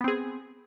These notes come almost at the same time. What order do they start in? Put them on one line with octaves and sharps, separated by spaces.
B3 C4 G#4